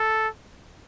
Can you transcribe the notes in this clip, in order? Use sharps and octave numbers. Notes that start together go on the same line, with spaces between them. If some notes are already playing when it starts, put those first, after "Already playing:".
Already playing: A4